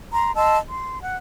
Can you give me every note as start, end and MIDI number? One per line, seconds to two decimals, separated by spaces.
0.12 0.33 82
0.12 0.33 84
0.36 0.57 75
0.36 0.57 81
0.36 0.57 84
0.36 0.57 88
0.69 1.01 84
1.02 1.15 78